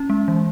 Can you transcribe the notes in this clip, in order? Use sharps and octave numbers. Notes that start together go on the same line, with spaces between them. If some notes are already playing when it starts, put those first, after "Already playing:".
Already playing: C#4
G#3
E3